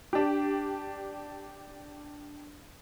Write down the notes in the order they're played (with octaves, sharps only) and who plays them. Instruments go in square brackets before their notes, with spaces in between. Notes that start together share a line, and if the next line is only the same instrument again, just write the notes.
[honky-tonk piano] D4 G4